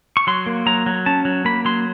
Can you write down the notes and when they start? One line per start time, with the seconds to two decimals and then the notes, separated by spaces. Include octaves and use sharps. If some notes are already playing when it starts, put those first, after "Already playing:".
0.17 C#6
0.27 F#3 C6
0.46 A#3
0.66 F#3 A#5
0.86 F#3
1.06 C#4 A5
1.25 F#3
1.45 A#3 B5
1.65 F#3 C6